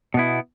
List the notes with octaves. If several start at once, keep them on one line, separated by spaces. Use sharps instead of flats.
B2 B3 E4